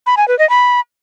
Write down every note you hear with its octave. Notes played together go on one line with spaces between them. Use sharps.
B5
G#5
B4
D#5
B5